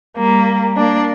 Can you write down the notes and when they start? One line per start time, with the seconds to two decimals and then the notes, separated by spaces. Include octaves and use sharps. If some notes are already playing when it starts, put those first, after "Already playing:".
0.17 G3 A#3
0.77 A#3 D4